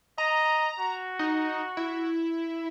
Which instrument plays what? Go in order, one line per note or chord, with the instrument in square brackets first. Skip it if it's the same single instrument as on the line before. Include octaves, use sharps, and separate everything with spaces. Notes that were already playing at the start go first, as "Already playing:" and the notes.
[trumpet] D#5 [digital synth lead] A#5
[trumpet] F#4
[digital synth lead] D#4
E4